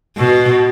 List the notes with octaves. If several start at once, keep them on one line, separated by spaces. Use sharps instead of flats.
B2